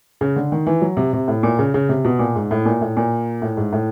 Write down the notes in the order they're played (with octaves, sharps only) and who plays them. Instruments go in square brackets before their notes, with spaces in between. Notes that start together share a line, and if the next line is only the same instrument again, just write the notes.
[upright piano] C#3
D3
D#3
E3
F#3
C3
C3
A2
A#2
C#3
C#3
C3
B2
A#2
G#2
A2
A#2
A2
A#2
A2
G#2
A2